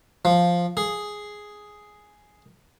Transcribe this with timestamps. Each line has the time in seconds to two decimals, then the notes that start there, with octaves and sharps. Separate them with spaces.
0.25 F3
0.77 G#4